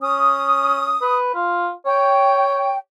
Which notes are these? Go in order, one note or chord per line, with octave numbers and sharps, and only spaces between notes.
C#4 D#6
B4
F4
C#5 G5